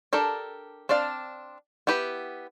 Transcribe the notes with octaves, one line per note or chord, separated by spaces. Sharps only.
D4 G4 A4 A#4 D5
C4 D4 D5 F5
B3 E4 G4 B4